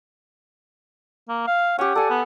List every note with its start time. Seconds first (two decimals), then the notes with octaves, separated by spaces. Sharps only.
1.29 A#3
1.47 F5
1.79 C#4 G4 F#5
1.95 A4 D5 G#5
2.10 B3